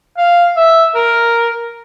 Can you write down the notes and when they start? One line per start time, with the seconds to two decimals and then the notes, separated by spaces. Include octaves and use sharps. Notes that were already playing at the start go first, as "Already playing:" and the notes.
0.18 F5
0.57 E5
0.95 A#4